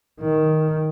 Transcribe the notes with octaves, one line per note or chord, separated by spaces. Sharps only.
D#3